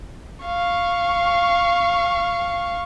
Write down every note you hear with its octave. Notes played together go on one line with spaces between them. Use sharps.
F5 C#6